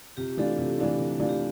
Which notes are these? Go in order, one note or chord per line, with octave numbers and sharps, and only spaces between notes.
C3 F4 G4
E3 A3 D4 F4 G4 A4
C3
E3 A3 D4 F4
C3
E3 A3 D4 F4
G4